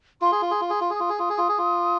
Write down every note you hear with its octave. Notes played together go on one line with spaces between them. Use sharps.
F4 C6
G#4
F4
G#4
F4
G#4
F4
G#4 D#6
F4
G#4
F4
G#4
F4
G#4
F4